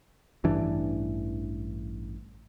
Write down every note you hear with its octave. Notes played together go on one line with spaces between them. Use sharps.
A1 G2 E3 D4